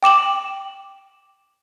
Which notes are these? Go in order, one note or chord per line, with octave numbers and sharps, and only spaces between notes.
G5 D6 E7 F#7